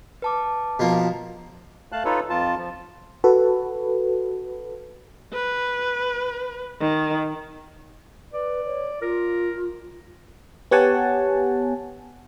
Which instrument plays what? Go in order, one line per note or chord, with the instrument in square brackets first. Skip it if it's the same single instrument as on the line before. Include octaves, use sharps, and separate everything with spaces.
[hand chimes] B4 A5 D6
[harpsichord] B2 F3 A#3
[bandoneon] A3 F5 A5 F#6
D#4 F4 A4 B4 C#5
F2 F4 A5
F3
[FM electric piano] F#4 A4 B4
[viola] B4
D#3
[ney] B4 [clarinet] D5
[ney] C#5
[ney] F4 [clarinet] A#4
[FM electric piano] B3 G4 C#5 F#5 G#5 A5